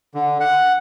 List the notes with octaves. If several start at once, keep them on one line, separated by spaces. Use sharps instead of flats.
D3
F#5